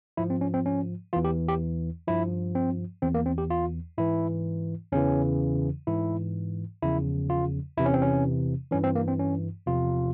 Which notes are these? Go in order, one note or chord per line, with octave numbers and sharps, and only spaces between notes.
G#2 F3 E4
C4
C#4
C4
C#4
E2 E3 F4
G4
G4
G2 F3 E4
C4
E2 E3 C4
A#3
C4
G4
F4
G#2 E3 E4
E2 C#3 E3 C#4
G#2 E3 E4
E2 C#3 F3 E4
F4
E2 C3 E3 E4
C#4
C4
C#4
G2 E3 C#4
C4
A#3
C4
C#4
E2 C3 F3 F4